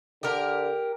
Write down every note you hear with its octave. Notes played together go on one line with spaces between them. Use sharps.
D3 G4 A#4